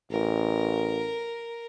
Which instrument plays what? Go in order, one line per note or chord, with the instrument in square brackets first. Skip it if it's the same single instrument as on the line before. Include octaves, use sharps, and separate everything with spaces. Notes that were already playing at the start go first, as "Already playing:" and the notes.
[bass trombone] A1 [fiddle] A#4